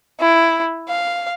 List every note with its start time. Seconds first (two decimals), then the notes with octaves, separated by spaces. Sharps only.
0.20 E4
0.89 F5